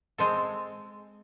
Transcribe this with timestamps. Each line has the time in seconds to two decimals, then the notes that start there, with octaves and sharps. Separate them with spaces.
0.18 G#3 C4 A4